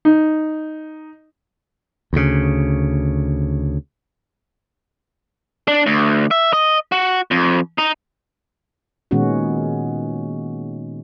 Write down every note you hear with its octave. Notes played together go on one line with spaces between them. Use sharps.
D#4
D2 C#3
D4
D2
E5
D#5
F#4
F2
D#4
A#2 D#3 G#3 B3 C#4 F#4